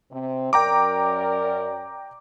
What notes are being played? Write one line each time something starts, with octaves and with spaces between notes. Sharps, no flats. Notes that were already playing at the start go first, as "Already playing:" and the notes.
C3 C4
F#2 A#4 D5 G5 A#5 D6